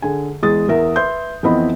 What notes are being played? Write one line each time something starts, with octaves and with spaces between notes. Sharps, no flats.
D3 G#4 G#5
E2 G#3 G#4 D#6 A6
E2 A#4 E5
B4 E5 C6 G6
F2 E3 B3 C4 D#5 B5